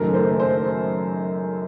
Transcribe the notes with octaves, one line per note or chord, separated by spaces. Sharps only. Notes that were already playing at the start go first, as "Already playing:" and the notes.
Already playing: F#1 F#2 D#3 A3 A#4
C5
C5